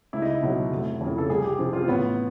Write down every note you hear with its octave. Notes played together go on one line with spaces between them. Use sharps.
C#2 E4
D#4
E4
B2 F#3
F1
F2 C#3 E3
A4
C2 G#4
G4
C3 F3
F4
C4
A1 B3